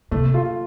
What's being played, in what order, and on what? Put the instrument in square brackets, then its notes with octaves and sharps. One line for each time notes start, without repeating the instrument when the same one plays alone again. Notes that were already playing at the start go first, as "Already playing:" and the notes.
[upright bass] C3 [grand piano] A3
[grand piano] F4